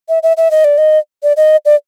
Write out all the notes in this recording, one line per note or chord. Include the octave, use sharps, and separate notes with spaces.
E5
E5
E5
D#5
D5
D#5
D5
D#5
D5